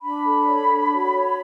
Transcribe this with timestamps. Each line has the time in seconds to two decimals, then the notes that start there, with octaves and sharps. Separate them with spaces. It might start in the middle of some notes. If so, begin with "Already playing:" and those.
0.02 D4 B5
0.24 A4
0.46 C#5
0.69 D4
0.92 F#4
1.15 C#5